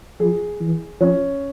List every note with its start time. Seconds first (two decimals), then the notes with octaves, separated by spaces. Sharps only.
0.20 F3 G#4
0.60 E3
1.00 F3 C#4